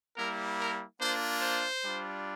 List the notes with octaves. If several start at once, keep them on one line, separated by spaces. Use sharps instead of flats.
G3 A#3 E4 A#4
A#4
A#3 D4 F4 C5
C5
G3 D4 F4